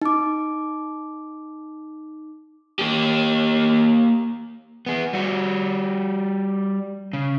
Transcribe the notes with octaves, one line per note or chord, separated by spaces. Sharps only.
D#4 D6
A#3 G4
B3 G#4
G3 F#4
C#3